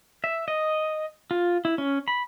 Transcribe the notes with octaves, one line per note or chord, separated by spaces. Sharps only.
E5
D#5
F4
E4
C#4
B5